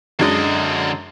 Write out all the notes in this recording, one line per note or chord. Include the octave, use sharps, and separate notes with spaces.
F#2 D3 G#3 D4 D#5